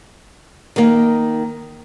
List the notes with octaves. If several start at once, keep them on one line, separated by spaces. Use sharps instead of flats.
D#3 A#3